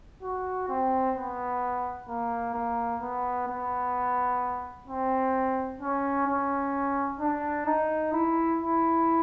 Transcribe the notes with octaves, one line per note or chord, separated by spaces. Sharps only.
F#4
C4
B3
A#3
A#3
B3
B3
C4
C#4
C#4
D4
D#4
E4
E4